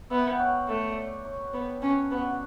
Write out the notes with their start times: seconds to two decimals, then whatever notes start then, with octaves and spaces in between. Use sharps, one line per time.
0.10 B3 E5
0.20 G5
0.30 F#5
0.39 C#5
0.68 A3
0.89 D5
0.97 C#5
1.25 C#5
1.40 B4
1.53 B3 G4
1.68 A4
1.82 C#4 B4
1.97 A4
2.11 B3 F#4
2.21 D4
2.31 F#4